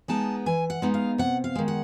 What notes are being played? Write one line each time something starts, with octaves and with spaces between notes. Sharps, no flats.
G#3 B3 D#4 A5
E3 G#5
F#5
G#3 B3 D#4
F5
C3 F#5
F5
D#3 G#3
F#5